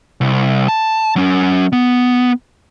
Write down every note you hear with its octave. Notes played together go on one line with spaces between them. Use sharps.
C2
A5
F#3 C#4
B3